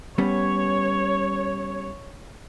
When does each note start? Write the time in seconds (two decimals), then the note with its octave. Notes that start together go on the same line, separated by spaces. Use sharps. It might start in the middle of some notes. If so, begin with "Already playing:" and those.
0.18 G3 B3 C#4 C#5